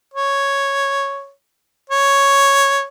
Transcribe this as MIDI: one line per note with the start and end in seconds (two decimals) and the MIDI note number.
0.14 1.31 73
1.90 2.86 73